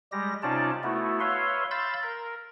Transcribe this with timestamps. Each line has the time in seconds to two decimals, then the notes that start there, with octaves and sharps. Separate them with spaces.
0.12 G3 G#3 G4 A#6
0.43 C3 C#4 D#4 F4 D5 A5
0.83 A3 B3 E4 F#4
1.20 B4 C#5 E5 F5 C6
1.71 F5 B5 C6 E6 G6 A6
2.02 A#4